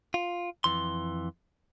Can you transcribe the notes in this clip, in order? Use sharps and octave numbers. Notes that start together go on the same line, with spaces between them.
F4
F2 E3 C6